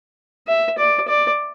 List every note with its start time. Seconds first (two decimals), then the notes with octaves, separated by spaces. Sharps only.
0.48 E5
0.78 D5
1.08 D5